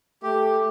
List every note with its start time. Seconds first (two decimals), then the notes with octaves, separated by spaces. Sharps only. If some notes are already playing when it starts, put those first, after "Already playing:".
0.23 A3 G4